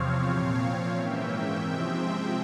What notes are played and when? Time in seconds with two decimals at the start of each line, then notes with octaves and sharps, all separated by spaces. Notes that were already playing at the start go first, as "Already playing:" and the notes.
Already playing: E2 C3 F3 C4 C#5 F5
0.32 A#2 F3 C4
0.95 G#2 E3 A#3 C#4 E5 G5
1.27 E5 G5
1.60 C3 F3 G#3 C4